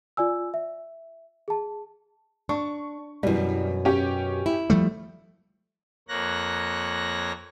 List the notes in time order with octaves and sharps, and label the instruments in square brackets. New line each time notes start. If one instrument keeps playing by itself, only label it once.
[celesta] F4 D5 G#5 E6
E5
G#4 A5
[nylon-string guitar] D4 [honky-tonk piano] C#6
[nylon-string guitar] F#2 B2 [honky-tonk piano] E3 G3
[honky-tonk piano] C#4 G4
[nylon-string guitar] E4
[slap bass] F3 G3 A3
[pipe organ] F2 A#3 C#5 F#6 A#6